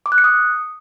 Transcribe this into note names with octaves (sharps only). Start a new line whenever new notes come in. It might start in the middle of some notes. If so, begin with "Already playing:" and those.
D6
F#6
C#7
D#6